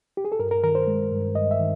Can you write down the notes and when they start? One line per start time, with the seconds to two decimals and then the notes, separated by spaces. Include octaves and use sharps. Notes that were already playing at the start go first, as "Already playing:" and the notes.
0.17 G4
0.25 G#4
0.32 A4
0.39 G2 A#4
0.51 A#4
0.63 D#3 A#4
0.75 C5
0.87 G#3
1.12 G2
1.35 G2 D#5
1.51 E5
1.60 D#3